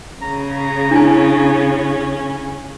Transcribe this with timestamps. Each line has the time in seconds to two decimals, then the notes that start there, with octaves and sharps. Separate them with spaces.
0.22 C#3 A#5
0.91 C#4 D4 E4 G#5